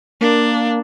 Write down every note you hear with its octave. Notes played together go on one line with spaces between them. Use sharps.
A#3 D4